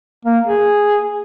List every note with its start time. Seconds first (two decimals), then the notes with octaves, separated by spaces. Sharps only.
0.25 A#3
0.46 G#4